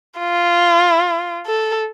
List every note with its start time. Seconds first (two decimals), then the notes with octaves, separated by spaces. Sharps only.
0.18 F4
1.47 A4